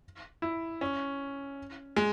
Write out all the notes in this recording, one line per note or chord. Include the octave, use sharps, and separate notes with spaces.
E4
C#4
G#3